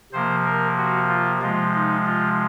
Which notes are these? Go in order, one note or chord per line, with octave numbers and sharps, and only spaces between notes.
C3 F3 A#3 C5
A#4
F#4
F4
C3 F3 G#3 F4
D#4
F4